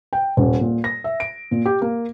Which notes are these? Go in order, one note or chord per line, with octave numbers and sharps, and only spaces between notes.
G5
D#1
A#2
A#6
E5
D7
A#2
G4
A#3